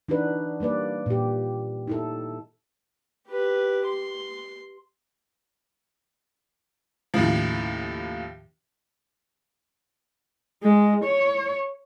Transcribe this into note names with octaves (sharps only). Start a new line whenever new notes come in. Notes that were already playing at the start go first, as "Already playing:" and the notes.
E3 D4 D#4 F#4 B4
G3 A#3 B4 D5
A#2 G4
D#4 E4 A4
G4 B4
C6
D#2 A2 C#3 F3
G#3
C#5